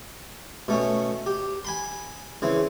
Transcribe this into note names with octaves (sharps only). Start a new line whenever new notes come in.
B2 A3 C#4
G4
G#5 B5 C6
C#3 E3 C4